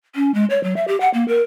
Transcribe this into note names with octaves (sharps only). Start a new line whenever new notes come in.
C#4
G#3
C#5
F#3
E5
G4
F#5
A#3
A#4